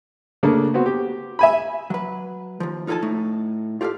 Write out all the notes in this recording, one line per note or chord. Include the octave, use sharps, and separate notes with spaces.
C#3 A3 A#3 D4
B3 C4 F#4
G4
E5 G#5 B5
F#3 B4
D#2 F3
D#4 F4 A4 A#4 G#5 A5
A2 A3 D#4
F4 G4 A4 C#5 F5